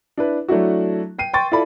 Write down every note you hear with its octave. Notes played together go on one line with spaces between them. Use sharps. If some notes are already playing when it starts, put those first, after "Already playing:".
D4 E4 B4
F#3 A3 D4 E4 F#4
G5 C7 D#7
G5 C6 C#6 A6
E4 F4 A4 D5 B5